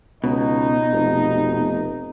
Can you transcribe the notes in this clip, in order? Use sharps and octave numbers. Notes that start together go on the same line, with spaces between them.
C#2 B2 D#4
F1